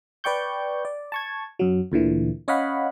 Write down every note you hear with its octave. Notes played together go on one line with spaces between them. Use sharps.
B4 D5 G5 C#6 G6
D5
A5 C#6 G#6
F#2 F#3
D2 A#2 D3 E3
C#4 C#5 D#5 F5 F#5 B5